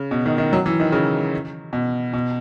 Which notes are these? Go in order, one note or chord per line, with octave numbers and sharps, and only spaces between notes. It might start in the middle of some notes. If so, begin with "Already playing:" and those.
Already playing: C#3
B2
D#3
D#3
F#3
E3
D#3
C#3
B2
B2